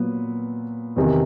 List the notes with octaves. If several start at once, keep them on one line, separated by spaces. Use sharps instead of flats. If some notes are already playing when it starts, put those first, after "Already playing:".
Already playing: A#2 F#3 B3
E2 C3 D#3